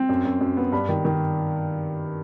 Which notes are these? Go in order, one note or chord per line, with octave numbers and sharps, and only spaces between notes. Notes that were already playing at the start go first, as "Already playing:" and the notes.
Already playing: C4
F#2
F#2
F#2
B3
G2 B5
D#3
D#3